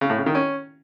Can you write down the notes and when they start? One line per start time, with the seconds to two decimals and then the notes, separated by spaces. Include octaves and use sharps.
0.01 C#3
0.10 A2
0.18 C#3
0.26 D#3
0.35 C#4